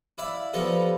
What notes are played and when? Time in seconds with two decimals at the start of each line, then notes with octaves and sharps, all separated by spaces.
0.18 E4 D5 E5 F5
0.53 F3 G3 B3 A4 A#4